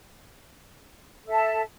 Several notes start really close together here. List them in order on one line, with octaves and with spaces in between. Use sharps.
A4 E5 A5